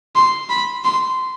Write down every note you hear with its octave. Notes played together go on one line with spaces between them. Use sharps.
C6
B5
C6